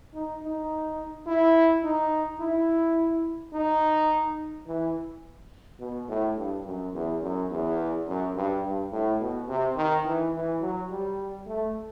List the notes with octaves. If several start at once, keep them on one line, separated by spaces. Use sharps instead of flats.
D#4
D#4
E4
D#4
E4
D#4
E3
B2
A2
G2
F#2
E2
F#2
E2
F#2
G2
G2
A2
B2
C3
D#3
E3
E3
F#3
G3
A3